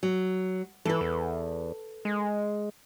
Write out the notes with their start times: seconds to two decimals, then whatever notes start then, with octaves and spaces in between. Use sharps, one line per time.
0.03 F#3
0.85 E3 A4 B4
1.01 E2
2.05 G#3